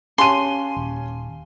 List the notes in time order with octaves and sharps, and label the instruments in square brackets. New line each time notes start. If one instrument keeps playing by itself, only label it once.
[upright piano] C#4 G4 D#7 [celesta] F5 G#5 A5 [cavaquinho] C6
[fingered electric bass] D#1